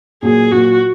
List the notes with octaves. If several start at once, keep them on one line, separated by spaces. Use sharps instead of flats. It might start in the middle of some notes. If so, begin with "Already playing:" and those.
A#2 F#3 A#3 G#4
A#2 F#3 A#3 F#4